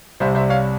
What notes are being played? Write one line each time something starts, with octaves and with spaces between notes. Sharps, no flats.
C2 C3 G3 C5 E5
C5 E5
C#5 F5